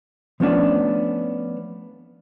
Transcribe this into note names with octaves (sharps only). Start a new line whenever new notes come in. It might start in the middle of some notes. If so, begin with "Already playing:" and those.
F3 A3 B3 C#4 D4